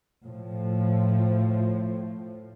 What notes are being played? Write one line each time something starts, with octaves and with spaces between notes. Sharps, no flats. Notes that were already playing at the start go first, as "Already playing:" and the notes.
A2 F3